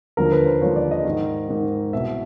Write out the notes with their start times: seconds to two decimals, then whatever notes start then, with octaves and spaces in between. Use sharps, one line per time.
0.17 D#2 D3 F3 A#4
0.32 B4
0.46 C5
0.61 D#2 D3 F3 C#5
0.76 D5
0.91 D#5
1.05 G#2 D#3
1.48 G#2 D#3
1.93 C2 B2 E5